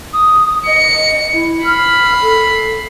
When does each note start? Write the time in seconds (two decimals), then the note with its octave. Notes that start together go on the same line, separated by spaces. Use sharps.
0.13 D#6
0.66 D#5 C#7
1.33 E4
1.64 B5 F6 C7
2.21 A4